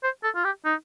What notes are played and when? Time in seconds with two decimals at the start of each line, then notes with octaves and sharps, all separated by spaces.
0.03 C5
0.23 A4
0.35 F4
0.44 G4
0.65 D#4